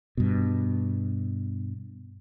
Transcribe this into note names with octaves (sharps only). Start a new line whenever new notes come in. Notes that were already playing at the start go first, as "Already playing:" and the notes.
G2 B2